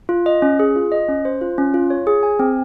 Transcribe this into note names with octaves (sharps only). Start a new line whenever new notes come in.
F4
D#5
C#4
G#4
F4
D#5
C#4
C5
F4
C#4
F4
C#5
G#4
G#5
C4